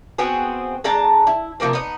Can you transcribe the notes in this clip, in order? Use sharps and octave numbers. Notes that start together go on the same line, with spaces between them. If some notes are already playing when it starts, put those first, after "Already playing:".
B3 C4 F#4 G#4
G#3 D4 A5 A#5
E4
C3 F3 A#3 C4
B3 D#4